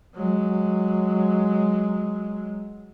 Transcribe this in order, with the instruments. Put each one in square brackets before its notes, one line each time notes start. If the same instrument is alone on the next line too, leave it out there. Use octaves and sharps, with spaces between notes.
[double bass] F#3 G#3